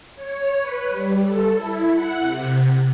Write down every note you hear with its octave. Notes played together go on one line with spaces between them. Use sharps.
C#5
B4
G3
A4
E4
F#5
C3